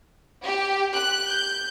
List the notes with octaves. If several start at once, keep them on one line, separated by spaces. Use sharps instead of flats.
G4
F#6
G6